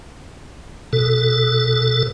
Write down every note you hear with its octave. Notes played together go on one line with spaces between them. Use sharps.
B2 A4